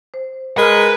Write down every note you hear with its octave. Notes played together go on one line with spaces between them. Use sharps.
C5
G#3 A#4 B4 A#5 B5 F6